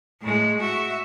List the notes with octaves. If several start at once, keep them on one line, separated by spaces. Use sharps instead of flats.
A2 G#3
F#4 E5